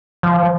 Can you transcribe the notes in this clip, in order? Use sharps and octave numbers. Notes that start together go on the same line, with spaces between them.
F3